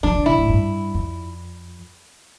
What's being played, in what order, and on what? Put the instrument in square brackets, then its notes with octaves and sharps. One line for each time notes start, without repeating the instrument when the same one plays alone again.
[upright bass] F3 [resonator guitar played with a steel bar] D4
[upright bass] D3
[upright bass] A#2 [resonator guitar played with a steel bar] E4
[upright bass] A2
G2
F2